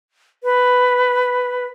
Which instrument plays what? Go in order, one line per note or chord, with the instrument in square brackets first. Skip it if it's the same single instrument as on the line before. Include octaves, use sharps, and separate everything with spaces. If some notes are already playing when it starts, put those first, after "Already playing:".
[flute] B4